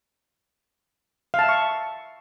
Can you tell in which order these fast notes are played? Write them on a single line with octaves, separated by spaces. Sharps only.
F5 A5 E5 C#6